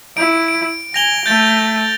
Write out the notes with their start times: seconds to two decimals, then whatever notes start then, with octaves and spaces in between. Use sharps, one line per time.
0.17 E4 D7
0.48 D7
0.94 G#5 A#6 F7 G7
1.26 A3 G6 A6 D7